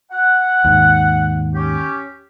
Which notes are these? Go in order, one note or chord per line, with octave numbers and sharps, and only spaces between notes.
F#5
D#2 G#2
C#4 G4